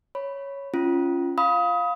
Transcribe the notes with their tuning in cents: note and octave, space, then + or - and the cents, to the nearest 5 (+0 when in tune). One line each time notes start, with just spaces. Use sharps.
C#5 +0 B5 +0
C#4 +0 F4 -20
F5 +10 B5 +0 D#6 +25